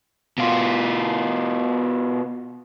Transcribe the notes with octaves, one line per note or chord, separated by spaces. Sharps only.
B2 F4